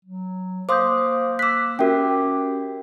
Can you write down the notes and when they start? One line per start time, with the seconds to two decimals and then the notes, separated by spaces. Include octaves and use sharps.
0.05 F#3
0.69 A#3 C5 F5 C6 D6 D#6 G6
1.39 D6 E6 F#6 B6
1.79 C#4 F#4 G4 A#4 E5 G5